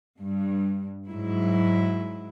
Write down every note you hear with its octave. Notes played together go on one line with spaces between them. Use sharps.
G2
G#2 F#3 E4